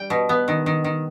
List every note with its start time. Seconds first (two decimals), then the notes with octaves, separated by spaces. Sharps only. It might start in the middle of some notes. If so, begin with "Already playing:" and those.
Already playing: G3 G5
0.10 B2
0.29 B3
0.48 D#3
0.66 D#3
0.84 D#3